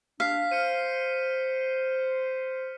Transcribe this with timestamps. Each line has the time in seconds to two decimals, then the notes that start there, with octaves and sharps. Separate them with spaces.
0.20 D4 F5 B6 C7
0.51 C5 F6 C#7 D#7